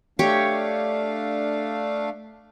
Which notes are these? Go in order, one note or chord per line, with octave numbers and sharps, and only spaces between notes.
A3 D4 G4 C#5 F5